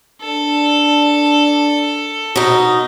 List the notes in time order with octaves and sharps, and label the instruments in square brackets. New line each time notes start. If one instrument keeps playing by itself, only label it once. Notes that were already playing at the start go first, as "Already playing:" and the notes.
[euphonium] D4 [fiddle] A4
[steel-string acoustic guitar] B2 D#4 [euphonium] F#4